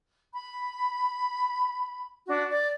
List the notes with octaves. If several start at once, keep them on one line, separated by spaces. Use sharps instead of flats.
B5
D4 F#4
D5